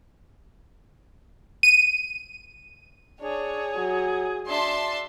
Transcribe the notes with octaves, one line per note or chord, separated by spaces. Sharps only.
D#7
D4 G#4 C#5
F#3
D4 E5 A5 C6